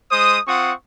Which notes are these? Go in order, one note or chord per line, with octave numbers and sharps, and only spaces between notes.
G#3 C5 D#6
C4 F4 F#5 C#6 D#6